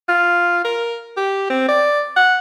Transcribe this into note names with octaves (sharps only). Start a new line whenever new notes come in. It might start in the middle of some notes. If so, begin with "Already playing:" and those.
F4
A#4
G4
C4
D5
F#5